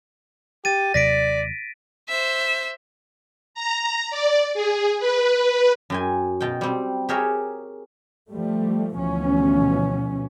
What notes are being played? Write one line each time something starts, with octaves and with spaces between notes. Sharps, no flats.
G4 A6 D#7
D#2 C3 F#3 D5 A#6 B6 D7
C5 E5
A#5
D5
G#4
B4
F#2 G5 G#5
B2 G5
G3 C4
G4 G#4 A#4 C#5 E5
F3 G3 A3
D2 B2 E3 F3 C#4